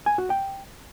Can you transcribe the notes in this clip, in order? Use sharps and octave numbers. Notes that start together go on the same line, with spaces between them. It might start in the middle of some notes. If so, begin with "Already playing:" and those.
G#5
F#4
G5